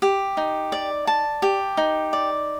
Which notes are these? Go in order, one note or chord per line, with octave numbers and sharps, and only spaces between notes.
G4
D#4
D5
A5
G4
D#4
D5